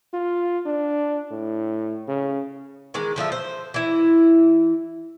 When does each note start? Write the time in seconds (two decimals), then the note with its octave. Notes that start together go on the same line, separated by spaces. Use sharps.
0.14 F4
0.66 D4
1.31 A2
2.08 C#3
2.94 D#3 E3 G#3 D#4
3.16 D3 F3 F4 E5
3.32 C5
3.74 E3 E4